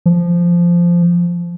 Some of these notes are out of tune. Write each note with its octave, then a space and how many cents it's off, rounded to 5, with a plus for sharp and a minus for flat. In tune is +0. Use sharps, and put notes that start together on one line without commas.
F3 -10